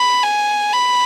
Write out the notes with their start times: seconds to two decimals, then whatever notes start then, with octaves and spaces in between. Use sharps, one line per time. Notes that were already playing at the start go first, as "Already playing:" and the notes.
Already playing: B5
0.23 G#5
0.73 B5